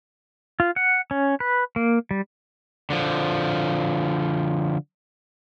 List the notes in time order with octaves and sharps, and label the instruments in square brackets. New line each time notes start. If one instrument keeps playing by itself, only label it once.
[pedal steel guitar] F4
F#5
C#4
B4
A#3
G3
[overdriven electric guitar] D3 F3